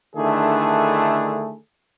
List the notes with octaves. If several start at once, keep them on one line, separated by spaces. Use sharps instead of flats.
D3 D#3 A3 D4 E4 G#4